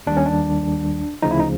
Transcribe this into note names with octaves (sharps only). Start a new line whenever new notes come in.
D#2 D#3 G3 D4
C#4
D4
D2 C#3 F3 D#4
E4
D#4